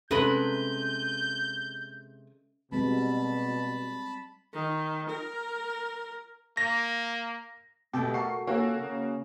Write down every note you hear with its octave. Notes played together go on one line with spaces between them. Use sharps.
C3 G#3 C#4 A4 B4 G6
B2 G3 G#3 C4 A5 B5
D#3
A#4
A#3 A#6
B2 A3 G4 A4 G5
F#4 A4 A#4 C#6 C7
A#3 C#4 F#4 A4
C#3